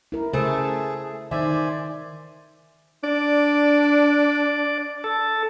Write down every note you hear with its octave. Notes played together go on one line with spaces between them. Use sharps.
E4 A#4
C#3 A3 G#4 C5
D#3 C5 D5 E5 G#5
D4 D5
A4